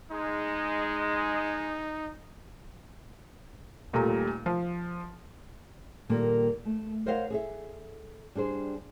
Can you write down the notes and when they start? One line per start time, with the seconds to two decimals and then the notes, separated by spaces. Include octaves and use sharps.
0.11 G#3 D#4
3.93 D#1 A#2 G3 A3 A#5
4.46 F3
6.09 A#2 D#3 G3 A#3 A4
6.65 A3
7.06 A#4 C5 C#5 D#5 F5 F#5
7.30 G#4 A4 E5
8.35 G3 D4 G#4 C5